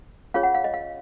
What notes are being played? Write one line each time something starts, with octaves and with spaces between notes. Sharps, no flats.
C#4 F4 G#4 C#5 F5
F#5
F5
D#5
F5